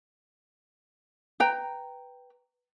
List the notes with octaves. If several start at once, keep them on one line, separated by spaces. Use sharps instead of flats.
B4 G5 A#5